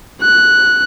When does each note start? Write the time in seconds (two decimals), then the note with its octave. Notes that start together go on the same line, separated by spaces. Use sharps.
0.22 F#6